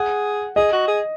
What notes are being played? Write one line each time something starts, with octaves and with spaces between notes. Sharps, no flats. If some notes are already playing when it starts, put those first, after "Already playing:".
Already playing: G#4 F#5
G#4 D#5
F#4
G#4